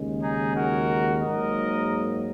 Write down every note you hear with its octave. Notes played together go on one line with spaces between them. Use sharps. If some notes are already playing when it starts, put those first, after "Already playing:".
Already playing: D#2 C#3 G#3
D#4 G#4
F#4 A#4
G#2 F#3 A#3 A#4 D#5